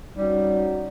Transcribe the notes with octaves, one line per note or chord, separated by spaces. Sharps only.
G3 C#4 D#4 F#4